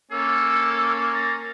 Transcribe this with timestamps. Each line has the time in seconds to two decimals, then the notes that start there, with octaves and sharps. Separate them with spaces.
0.12 A#3 C#4 A4 E6
1.14 A#5 A6